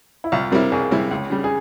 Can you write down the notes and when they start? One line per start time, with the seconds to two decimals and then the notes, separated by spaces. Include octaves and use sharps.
0.24 E4
0.32 C2 F4
0.52 C3 G3 C4 E4 A#4
0.72 C2 G#4
0.91 C3 G3 C4 E4
1.11 C#2
1.30 C#3 G3
1.44 G#4